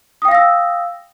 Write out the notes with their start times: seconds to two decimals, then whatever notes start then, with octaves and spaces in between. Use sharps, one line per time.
0.22 D#6
0.25 G5
0.28 F5
0.31 A#6
0.35 E6